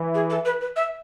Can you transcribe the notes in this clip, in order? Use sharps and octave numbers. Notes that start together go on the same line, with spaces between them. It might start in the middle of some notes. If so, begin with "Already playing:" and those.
Already playing: E3
G#4
A4
B4
B4
E5